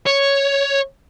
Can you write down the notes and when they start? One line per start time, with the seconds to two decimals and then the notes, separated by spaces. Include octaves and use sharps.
0.07 C#5